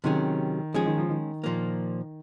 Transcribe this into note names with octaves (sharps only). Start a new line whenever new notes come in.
C3 D#3 F#3 C#4 G#4
F3 G#3 C#4 G#4
D#3
F3
D#3
A#2 F3 A#3